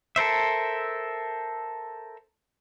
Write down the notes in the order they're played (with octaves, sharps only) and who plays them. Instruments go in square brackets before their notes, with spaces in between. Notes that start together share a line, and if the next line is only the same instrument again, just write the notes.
[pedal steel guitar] A4 A#4 C5 E5